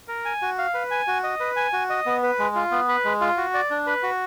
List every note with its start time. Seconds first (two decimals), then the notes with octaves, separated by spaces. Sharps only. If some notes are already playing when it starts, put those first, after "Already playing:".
0.08 A#4
0.25 G#5
0.42 F#4
0.58 F5
0.74 B4
0.91 G#5
1.07 F#4
1.24 D#5
1.40 B4
1.56 G#5
1.73 F#4
1.90 D#5
2.06 B3
2.23 B4
2.39 G#3
2.55 F4
2.71 B3
2.88 B4
3.05 G#3
3.21 F4
3.37 F#4
3.54 D5
3.70 D4
3.87 B4
4.03 F#4